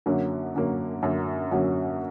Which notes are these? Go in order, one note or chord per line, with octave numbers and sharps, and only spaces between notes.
F#2 D3 F#3 A#3 C#4
F#2 D3 F#3 A#3 C#4
F#2 D3 F#3 A#3 C#4
F#2 D3 F#3 A#3 C#4